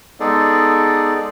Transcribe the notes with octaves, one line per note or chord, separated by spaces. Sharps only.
G#3 B3 D#4 G#4 A4 D5